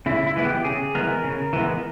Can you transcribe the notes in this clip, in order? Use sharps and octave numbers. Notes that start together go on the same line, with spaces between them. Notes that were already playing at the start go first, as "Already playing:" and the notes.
C#3 E4
E4
E3 G#3 B3
G4
C#3 G#4
E3 G#3 B3 A#4
C#3
E3 G#3 B3